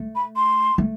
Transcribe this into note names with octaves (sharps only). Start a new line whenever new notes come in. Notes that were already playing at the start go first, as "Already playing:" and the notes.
Already playing: A3
B5
C6
A3